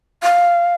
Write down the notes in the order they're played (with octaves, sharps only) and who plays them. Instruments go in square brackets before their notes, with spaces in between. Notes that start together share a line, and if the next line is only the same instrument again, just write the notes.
[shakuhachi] F5